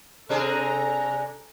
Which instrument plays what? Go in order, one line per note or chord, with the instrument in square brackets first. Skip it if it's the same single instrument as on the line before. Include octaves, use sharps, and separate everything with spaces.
[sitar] C3 D4 G#4 [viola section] A4 A#5